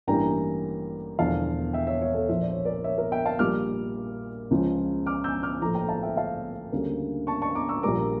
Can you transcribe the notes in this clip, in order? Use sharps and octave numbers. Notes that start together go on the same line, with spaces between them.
A1 G2 E3 G3 A#3 G5 A#5
E1 E2 D3 F3 F5 A5
E5 G5
C#5 E5
C#5 E5
A4 C#5
A#1 A#2 F3 E5
D5
C#5
A#4 D5
C#5 E5
A#4
E5 G5
F5 A5
A#1 A#2 G3 A#3 D6 F6
C#2 C#3 F3
D6 F6
E6 G6
D6 F6
A#1 A2 F3 A3 A#5 D6
G5 A#5
F5 A5
E5 G5
F5 A5
D2 C#3 G3 A#3
A5 C#6
A5 C#6
A#5 D6
C#6 E6
A#1 A#2 G3 A#3 A#5 D6